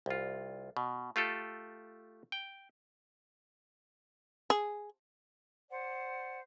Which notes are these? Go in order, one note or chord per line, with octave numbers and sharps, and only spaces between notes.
C2 F4
B2
A3 F4 G4 A4
G5
G#4
C5 D5 F#5